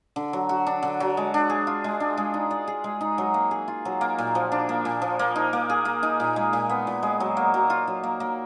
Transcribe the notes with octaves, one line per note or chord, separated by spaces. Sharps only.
D3
F#3
F#4
D4
D3
F#3
G#3
D4
G#4
F4
G#3
D4
G#3
D#4
D5
G#4
G#3
D#4
F#3
A#3
G#4
F4
F#3
A#3
A#2
F3
D4
A#3
A#2
F3
A#3
D#4
A#3
G#4
A#3
D#4
A#2
G#3
A#2
B3
A#2
G#3
F#3
A#3
F#3
F4
F#3
A#3
A#3